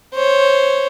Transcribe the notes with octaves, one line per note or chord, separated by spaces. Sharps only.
C5 C#5